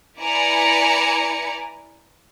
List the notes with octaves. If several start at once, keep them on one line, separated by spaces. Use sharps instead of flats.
E4 B4 D5 G#5 A#5 C#7